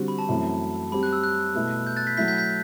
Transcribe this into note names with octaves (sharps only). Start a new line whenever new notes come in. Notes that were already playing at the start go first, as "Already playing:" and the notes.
Already playing: D3 G3 C4 F#4
B5
A5
F#2 E3 A3 C4
G3 C4 G4 B5
F#6
E6
F#6
B2 A3 E4
G6
F#6 A6
G6 B6
F#3 A3 E4 G6 B6
G6 B6
G6 B6